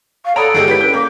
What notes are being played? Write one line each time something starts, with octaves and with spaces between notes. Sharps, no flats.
F5 C#6
A4 C#5 D5 F#5 A#5 B5 D#6 D7
G1 G#3 G4
E4 G4 A4 B4 C#5 B6
C#4 B4 G6
A#3 D6